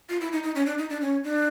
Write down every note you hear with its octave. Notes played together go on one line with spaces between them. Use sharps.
F4
E4
D#4
D#4
C#4
D4
D#4
D4
C#4
D4